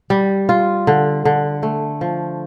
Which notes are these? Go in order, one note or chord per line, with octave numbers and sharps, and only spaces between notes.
G3
F4
D3
D3
A3
F3